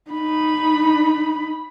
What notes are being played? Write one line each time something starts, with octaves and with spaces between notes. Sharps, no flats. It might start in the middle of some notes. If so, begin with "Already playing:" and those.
D#4 B5